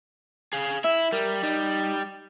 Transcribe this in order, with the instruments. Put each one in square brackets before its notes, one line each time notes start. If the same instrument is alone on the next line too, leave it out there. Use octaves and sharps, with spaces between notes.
[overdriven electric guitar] G#4 F5
[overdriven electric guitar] E4 [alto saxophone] E5
[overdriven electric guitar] G3 [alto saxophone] A#4
[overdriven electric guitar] G3 [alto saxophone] D#4